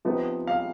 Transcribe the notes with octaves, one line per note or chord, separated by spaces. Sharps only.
C3 F3 B3 D#4
F5